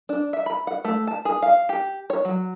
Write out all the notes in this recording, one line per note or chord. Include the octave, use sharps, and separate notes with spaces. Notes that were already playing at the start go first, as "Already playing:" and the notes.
D4
E5
B5
F#5
A3
A5
G#4
F5
G4
C#5
F#3